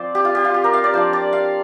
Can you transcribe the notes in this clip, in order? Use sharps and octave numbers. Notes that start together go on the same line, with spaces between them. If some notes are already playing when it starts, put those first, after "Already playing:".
Already playing: F3 C4 C5 D5
G4
F4
G4
F4
G4
A#4
F5
D5
F3 D4 F4 C5
D5
F5